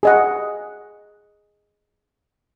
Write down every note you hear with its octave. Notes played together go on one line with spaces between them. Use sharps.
G#4 D#5 F#5